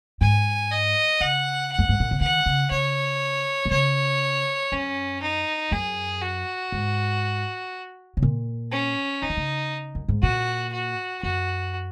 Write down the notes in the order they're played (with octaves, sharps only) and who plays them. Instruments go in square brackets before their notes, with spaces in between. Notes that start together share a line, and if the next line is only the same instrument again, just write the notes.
[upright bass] G#2 [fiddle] G#5
[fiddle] D#5
[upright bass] C#3 [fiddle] F#5
[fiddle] F#5
[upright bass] F#2
G#2
A#2
C#3
[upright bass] D#3 [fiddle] F#5
[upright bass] C#3
[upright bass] C#3 [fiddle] C#5
[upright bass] A#2
[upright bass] C#3 [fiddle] C#5
[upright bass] F#2 [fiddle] C#4
[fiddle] D#4
[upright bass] F#2 [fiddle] G#4
[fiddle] F#4
[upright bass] G#2
C#3
A#2
[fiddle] C#4
[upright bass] C#3 [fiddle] D#4
[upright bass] D#3
C#3
F#2
G#2
[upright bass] A#2 [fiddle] F#4
[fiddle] F#4
[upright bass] F#2 [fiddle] F#4